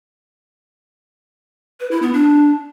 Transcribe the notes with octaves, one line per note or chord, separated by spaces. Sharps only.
B4
E4
B3
D4